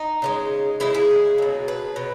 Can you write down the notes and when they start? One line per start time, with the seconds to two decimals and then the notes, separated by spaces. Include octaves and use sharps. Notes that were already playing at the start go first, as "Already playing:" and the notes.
Already playing: D#4
0.22 C#3 E3 G#3
0.80 C#3 G#3 E4
0.94 G#4
1.38 B2 F#3
1.68 B4
1.96 B2